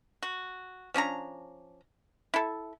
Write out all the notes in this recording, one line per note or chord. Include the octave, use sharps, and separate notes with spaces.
F#4
F3 C#4 D4 A#5
E4 A4